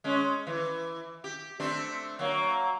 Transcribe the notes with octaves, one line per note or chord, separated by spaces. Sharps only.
G#3 C#4
E3
G4
A3 C4 D4
F#3 A#3